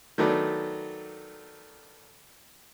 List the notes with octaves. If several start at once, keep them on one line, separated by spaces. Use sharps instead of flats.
D#3 F#3 A3 B3 D4 D5